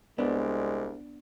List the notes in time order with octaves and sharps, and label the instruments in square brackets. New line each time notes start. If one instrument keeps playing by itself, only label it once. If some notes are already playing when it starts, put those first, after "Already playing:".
[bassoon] C2 [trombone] G#3 [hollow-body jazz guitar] B3 D4